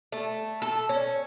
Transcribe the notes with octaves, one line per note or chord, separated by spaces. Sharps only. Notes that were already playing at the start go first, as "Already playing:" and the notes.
A3
A4
C#4